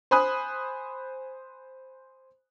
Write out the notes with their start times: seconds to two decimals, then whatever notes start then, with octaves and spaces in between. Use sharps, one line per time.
0.11 C5 G#5 B5 D#6 F#6